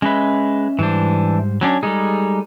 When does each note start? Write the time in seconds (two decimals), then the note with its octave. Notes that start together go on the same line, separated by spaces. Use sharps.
0.02 G#3 C#4 B4 D#5 E5
0.79 G#2 E3 G3 D4 C5
1.61 F#3 C#4 D4
1.83 G3 G#3 D#4 G#4 A4